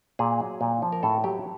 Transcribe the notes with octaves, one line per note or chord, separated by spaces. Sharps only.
A#2 G#4
F#3
A#2
F3
A#4
A2 A4
F#3 G4